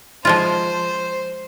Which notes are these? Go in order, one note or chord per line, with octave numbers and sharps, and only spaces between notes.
F3 G#3 F4 C5